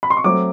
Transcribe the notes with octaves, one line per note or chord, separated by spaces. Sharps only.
B5
C6
C#6
F#3 A3 C4 D6